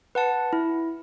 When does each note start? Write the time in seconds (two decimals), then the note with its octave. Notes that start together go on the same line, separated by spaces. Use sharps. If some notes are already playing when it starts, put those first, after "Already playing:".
0.15 B4 F#5 A5
0.53 E4